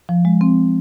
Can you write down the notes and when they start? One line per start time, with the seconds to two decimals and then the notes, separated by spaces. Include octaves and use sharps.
0.09 F3
0.25 G#3
0.41 C4